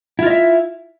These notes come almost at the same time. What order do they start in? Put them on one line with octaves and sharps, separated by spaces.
E4 F4 D#5 E5